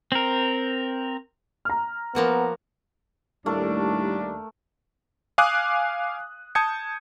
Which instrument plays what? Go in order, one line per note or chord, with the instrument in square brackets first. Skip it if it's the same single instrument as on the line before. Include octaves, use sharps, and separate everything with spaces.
[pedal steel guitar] C4 A#4
[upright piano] A#5 F6
[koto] F3 A#3 F#4 [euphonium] B3
[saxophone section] D#2 D4 [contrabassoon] A2 [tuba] G3 [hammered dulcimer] A3 A#4
[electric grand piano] F5 G#5 D6 D#6 F#6
A5 D#6 G6 G#6 C#7